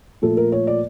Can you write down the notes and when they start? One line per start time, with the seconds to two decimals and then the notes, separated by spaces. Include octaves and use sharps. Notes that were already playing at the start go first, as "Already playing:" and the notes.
0.22 A#2 F3 A3 A4
0.37 A#4
0.52 C#5
0.67 D5